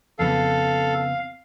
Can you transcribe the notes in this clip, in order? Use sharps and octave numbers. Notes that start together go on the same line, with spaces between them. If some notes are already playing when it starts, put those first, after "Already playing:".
F2 C#3 B3 A4 F5